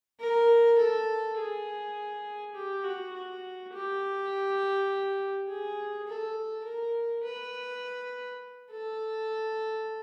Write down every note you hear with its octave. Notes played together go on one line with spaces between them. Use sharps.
A#4
A4
G#4
G4
F#4
F#4
G4
G#4
A4
A#4
B4
A4